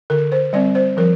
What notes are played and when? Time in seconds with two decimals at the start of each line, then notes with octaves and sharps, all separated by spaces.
0.10 D3 A#4
0.32 C5
0.53 G3 C4 D5
0.75 C5
0.97 F3 A#4